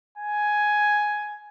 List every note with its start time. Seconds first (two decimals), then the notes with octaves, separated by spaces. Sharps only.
0.18 G#5